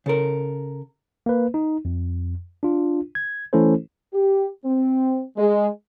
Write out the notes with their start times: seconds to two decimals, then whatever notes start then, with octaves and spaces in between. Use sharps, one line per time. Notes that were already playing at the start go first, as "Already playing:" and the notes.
0.06 C#3 A4 A#4
1.26 A#3 B4
1.54 D#4
1.85 F2
2.63 D4 F4
3.15 G#6
3.53 E3 A3 C#4 E4 A4 C5
4.13 G4
4.64 C4
5.37 G#3